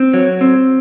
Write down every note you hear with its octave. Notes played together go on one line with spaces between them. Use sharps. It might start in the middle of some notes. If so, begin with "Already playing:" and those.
Already playing: C4
F#3
C4